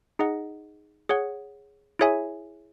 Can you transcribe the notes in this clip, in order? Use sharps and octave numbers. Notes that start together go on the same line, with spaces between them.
D#4 G#4 D#5 F#5
G#4 C#5 F#5
E4 G#4 C#5 E5 G#5